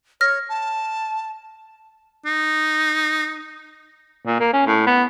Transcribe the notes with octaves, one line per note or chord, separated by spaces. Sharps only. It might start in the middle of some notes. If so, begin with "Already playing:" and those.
C#5 F6 A#6
A5
D#4
A#2
A#3
C#4
A2
B3